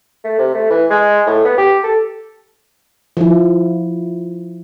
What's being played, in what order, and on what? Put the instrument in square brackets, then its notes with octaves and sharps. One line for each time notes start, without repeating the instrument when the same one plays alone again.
[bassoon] A3
C3
A3
E3
G#3
A2
B3
G4
A4
[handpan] F3 E4